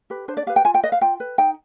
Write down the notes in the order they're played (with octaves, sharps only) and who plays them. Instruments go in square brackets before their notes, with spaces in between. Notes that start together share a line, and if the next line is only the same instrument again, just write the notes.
[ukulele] G4 B4
D4 C5
D5
G4 B4 F5
G5
F4 G#5
G5
B4 D#5
F5
F4 G5
B4
D#4 G5